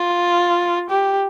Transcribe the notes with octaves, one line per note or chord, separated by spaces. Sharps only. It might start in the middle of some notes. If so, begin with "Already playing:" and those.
Already playing: F4
G4